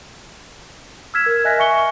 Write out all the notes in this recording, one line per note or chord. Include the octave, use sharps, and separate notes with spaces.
E6 F6 G#6 B6 E7
A#4
D#5 E5 G#5 F#6 A#6 B6
E5 G#5 C#6 C#7 G7